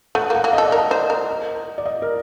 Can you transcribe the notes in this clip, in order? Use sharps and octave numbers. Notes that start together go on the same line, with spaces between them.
A3 F#5
A#3 F#5
A#3
A4 D#5
D5
A#4
D#5
C5
A#4
D5
D#5
A#4